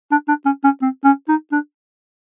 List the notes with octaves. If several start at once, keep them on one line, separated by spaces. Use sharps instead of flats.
D4
D4
C#4
C#4
C4
C#4
D#4
D4